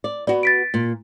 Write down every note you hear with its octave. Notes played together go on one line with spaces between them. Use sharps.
D5
B3 F#4 D5
A6 B6 D7
A#2